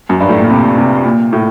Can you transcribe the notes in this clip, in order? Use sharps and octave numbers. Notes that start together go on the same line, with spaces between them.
F#2
G2
A2
A#2
C3
C3
A#2
A2